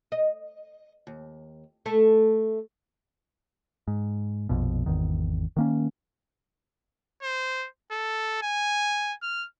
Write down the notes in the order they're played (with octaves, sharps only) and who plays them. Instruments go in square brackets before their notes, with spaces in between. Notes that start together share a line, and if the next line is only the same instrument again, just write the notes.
[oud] D#5
D#2
A3 A4
[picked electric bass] G#2
A#1 F2 B2
G#1 E2 D#3
D#3 A#3 C#4
[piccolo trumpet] C5
A4
G#5
F6